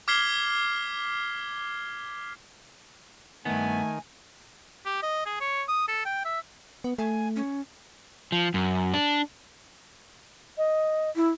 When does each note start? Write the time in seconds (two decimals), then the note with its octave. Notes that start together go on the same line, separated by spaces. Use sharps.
0.08 D6 F6 G#6 B6 C7 G7
3.45 G2 D#3 A3 B3 G#5
4.86 G4
5.03 D#5
5.26 G#4
5.40 C#5
5.68 D#6
5.88 A4
6.05 G5
6.25 E5
6.84 B3
6.98 A3 G#5
7.36 C#4
8.32 F3
8.54 F#2
8.94 D4
10.58 D#5
11.16 E4